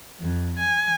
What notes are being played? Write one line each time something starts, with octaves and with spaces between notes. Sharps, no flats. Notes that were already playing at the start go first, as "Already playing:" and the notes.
F2
G#5